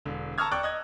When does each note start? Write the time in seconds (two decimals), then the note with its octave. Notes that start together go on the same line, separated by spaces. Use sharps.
0.05 E1 D3
0.38 A5 A#5 C#6 E6 F6 G#6
0.51 D5 G5 C#6 D6 F#6
0.63 D#5 F#6 G#6